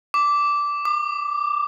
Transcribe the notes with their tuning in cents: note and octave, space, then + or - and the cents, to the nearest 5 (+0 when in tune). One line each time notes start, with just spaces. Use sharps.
D6 -10
D6 +35